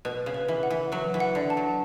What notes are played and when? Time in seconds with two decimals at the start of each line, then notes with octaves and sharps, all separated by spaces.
0.05 B2 B4
0.26 C#3
0.34 B4
0.48 E3
0.63 F#5
0.70 E3
0.92 F#3 B4
1.14 E3
1.20 F#5
1.35 D3
1.50 A5
1.57 F#3